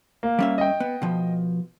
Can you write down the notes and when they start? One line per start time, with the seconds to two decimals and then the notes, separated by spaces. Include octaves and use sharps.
0.23 A#3
0.39 G3 C#4 E5
0.58 D#5 G5
0.80 B3
1.02 B2 F3